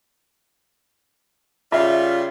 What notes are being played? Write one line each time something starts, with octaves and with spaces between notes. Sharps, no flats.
C#3 G3 F4 E5